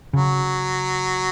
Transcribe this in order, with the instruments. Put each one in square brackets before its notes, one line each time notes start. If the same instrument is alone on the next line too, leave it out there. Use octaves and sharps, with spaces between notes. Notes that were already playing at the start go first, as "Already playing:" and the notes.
[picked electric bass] C#3 [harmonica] F#3